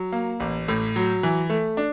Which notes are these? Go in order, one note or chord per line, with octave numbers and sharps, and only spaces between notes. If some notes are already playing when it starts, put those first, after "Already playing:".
Already playing: F#3
A#3
A1
A2
F#3
E3
A3
D4